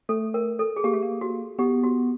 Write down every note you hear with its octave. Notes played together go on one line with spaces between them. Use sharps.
A3 A4
A#4
A4
G#4
A#3 G4
A3
A#3
F#4
B3 G4
F#4